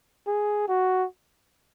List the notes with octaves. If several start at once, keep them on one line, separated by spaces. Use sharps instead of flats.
G#4
F#4